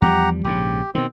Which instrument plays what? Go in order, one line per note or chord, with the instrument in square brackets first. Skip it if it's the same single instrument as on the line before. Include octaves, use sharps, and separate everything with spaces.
[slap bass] E2 F3 G3 [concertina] G4 F#5 A#5
[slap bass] A#1 G#2 C#3 [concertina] G4
[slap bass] B2 D#3 [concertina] C4